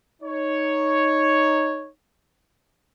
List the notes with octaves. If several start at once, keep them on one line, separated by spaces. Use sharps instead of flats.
D#4 C#5